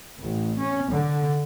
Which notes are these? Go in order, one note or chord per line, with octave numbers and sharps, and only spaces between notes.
A1
C#4
D3